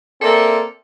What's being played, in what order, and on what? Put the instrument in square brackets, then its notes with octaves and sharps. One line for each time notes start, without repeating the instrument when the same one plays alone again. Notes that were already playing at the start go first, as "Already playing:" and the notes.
[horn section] A#3 C4 A4 D5 E5